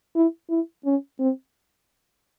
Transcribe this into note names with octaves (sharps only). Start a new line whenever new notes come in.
E4
E4
C#4
C4